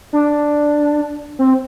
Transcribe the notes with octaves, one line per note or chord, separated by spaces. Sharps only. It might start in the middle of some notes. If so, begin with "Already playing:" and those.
D4
C4